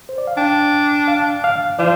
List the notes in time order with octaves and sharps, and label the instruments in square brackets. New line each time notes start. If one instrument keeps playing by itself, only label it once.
[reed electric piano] C5
D5
F5
[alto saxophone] D4 [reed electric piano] G5
[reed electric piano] F5
F5
[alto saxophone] F3 [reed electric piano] D5